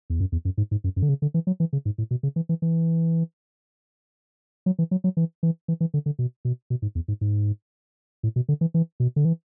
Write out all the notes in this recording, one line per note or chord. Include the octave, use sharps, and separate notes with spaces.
E2
F#2
E2
F#2
G#2
G#2
F#2
F#2
D3
C#3
D3
E3
F#3
E3
C#3
G#2
A2
B2
C#3
E3
E3
E3
F#3
E3
F#3
F#3
E3
E3
E3
E3
D3
D3
B2
B2
B2
G#2
E2
G#2
G#2
A2
B2
D3
E3
E3
B2
D3
E3